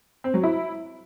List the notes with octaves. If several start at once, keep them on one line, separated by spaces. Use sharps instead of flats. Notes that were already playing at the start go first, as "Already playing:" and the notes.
C4
F#3
E4